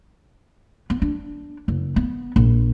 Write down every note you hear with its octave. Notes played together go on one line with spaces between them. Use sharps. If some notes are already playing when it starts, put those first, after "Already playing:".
B3
D4
F#1
B3
A#1